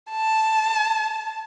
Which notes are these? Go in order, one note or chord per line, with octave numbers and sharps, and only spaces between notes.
A5